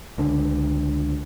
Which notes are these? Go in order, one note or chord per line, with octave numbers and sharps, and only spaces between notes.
C#2 D3